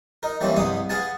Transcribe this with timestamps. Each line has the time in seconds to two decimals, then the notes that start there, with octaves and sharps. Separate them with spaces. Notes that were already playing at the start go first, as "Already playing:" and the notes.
0.23 D#4 A#4
0.41 E3 G3 A#3 C4 C#4 E4
0.56 C2 G2 G#3 B3 D#6
0.89 B3 G#4 F5 F#5 G#5 A5